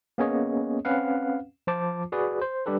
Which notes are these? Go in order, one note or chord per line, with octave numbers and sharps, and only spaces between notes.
A#3 B3 C#4 G#4 C#5 D#5
C4 C#4 B4 F5 F#5
F3 F4 C5 A5 D6
F#4 G#4 B4 D5
C5
G3 D4 G4 A4 B4